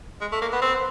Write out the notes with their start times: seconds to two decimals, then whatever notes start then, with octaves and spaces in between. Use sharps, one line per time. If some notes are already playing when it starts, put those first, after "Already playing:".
0.21 G#3
0.32 A3
0.41 A#3
0.52 B3
0.62 C4